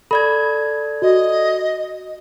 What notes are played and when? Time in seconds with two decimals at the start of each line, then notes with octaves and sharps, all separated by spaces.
0.11 A4 D5 B5 G#6
1.02 F#4 D#5